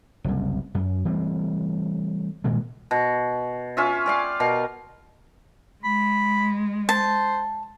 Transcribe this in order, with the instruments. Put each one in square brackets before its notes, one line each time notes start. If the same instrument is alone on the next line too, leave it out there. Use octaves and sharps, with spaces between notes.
[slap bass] F#1 C2
F#2
E3 G3 A3 C4
G2 A#2 D#3 G#3
[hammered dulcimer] B2
C#4 F4 E5
G4 D5 F5
B2 A#4 F5
[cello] G#3 [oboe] B5
[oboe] C5 [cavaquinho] A5